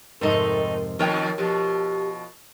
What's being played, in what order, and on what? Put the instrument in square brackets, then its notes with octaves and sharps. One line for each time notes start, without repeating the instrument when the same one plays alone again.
[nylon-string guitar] F2 G#2 C3 [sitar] A3 D#4 [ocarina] A#4
[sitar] F2 B2 D#3 [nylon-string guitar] A#4 C#5 G5
[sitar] B2 F3 [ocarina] G4